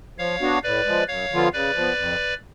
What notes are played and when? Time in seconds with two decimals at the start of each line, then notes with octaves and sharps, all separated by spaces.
0.18 F3 C#5 F5
0.41 B3 D4 F#4
0.63 A2 B4 D5
0.86 F3 G#3
1.08 F#2 C#5 F5
1.31 D3 F3 B3 F4
1.53 C#3 B4 D5
1.75 F3 B3
1.98 F2